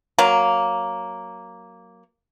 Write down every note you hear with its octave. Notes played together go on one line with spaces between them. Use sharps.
F#3 A#3